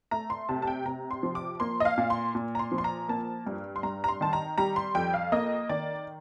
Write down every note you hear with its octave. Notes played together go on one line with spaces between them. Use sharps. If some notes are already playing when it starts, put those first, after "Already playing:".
A3 A#5
C6
C3 A5
A5
G5
C3 A#5
C6
F3
D6
A#3 C6
D#5
F5
A#2
C6
A#2
A#5
C6
F3
C6
A#5
A#3 A5
G2
C6
G2 A#5
A#5
C6
D#3 A5
A#5
G3 A#5
C6
F2 G5
F5
A#3 D#5
D#3 D5